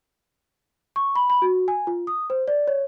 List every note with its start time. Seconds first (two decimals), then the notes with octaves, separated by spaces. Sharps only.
0.96 C#6
1.16 B5
1.30 B5
1.42 F#4
1.68 G#5
1.87 F4
2.07 D#6
2.30 C5
2.48 D5
2.67 C#5